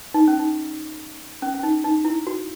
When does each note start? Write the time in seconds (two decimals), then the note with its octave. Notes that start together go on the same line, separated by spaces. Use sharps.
0.14 D#4
0.28 C#4
0.39 D#4
1.42 C#4
1.54 C#4
1.63 D#4
1.84 D#4
2.05 E4
2.27 F#4